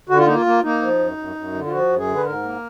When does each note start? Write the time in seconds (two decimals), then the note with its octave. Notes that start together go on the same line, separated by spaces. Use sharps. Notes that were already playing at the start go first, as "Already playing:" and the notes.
0.09 D3 F#4
0.18 F4
0.26 A#3 D#4
0.35 F4
0.46 A#3
0.63 A#3 D#4
0.82 F3
0.99 F#2
1.17 F#2
1.36 F#2
1.54 D3
1.66 F4
1.71 F3 F#4
1.89 F#2
1.98 G#4
2.07 D3
2.16 B4
2.25 G#2 A#4
2.43 A#3